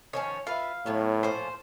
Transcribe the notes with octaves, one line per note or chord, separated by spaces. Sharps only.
D#3 F3 C#4 C#5
F4 B4 E5 F5
A2 F#3 B3 C#5
A#2 F3 C#4 C5